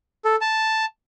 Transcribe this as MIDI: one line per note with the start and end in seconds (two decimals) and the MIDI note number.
0.25 0.36 69
0.41 0.85 81